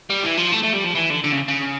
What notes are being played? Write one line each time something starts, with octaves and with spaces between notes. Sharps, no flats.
G3
E3
F3
A3
A3
G3
F3
E3
D3
D3
C#3
C#3